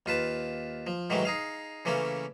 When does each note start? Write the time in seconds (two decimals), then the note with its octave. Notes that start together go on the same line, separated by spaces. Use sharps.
0.06 D#2 F4 B4 A5
0.87 F3
1.10 G#2 D#3 E3 F#3 G#3 A3
1.25 D#4 G#4 F5
1.85 C#3 E3 A3 A#3 C#4 A4